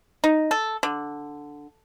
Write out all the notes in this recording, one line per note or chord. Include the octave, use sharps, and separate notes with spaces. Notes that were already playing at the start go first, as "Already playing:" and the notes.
D#4
A4
D3